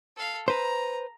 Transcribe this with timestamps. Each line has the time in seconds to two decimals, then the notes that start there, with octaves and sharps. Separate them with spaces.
0.17 A4 F5
0.48 B4 C5 A#5